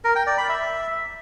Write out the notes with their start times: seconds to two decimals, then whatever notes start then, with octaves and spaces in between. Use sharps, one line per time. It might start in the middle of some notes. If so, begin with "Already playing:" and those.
0.04 A#4
0.16 G5
0.27 D5
0.38 B5
0.49 E5